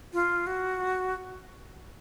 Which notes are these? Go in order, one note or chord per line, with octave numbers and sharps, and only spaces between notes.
F4
F#4